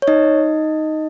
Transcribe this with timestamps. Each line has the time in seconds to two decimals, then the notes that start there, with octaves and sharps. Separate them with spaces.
0.02 C#5
0.07 D#4 D#5